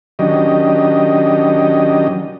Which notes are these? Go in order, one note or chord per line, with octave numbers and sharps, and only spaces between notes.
D#3 F#3 C#4 D4 G4 D#5